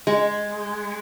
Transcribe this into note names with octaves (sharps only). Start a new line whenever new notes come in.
G#3